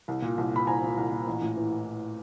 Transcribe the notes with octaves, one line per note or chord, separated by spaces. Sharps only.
C2
A#2
C2
A#2 B5
C2 G#5 A#5
A#2
C2
A#2
A1
A2
E3